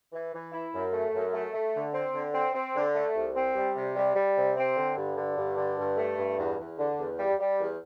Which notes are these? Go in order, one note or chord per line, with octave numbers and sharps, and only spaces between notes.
E3
E3
E4
F#2
A3
F#2
A3
A3
D3
C4
D3
C4
C4
D3
A3
C2
C4
G3
C3
G3
G3
C3
C4
D3
G2
D3
G2
D3
G2
A3
G2
E2
E2
D3
E2
G3
G3
E2